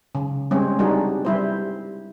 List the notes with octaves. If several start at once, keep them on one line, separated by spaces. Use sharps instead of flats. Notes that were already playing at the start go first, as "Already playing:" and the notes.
C#3
G3 G#3 C4 C#4
G3 D4 D#4 F#4 G#4
G3 E4 C5